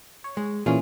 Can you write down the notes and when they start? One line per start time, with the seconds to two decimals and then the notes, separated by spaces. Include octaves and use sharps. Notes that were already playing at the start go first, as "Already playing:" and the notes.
0.24 C#5
0.37 G#3
0.66 A#2 E3 C#4 F4 G#4